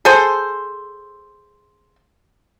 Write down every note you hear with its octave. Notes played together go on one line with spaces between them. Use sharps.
G#4 A4 C5